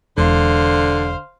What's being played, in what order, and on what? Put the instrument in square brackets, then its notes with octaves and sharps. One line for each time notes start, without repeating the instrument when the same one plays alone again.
[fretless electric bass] E1 [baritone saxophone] D3 [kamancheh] C5 F5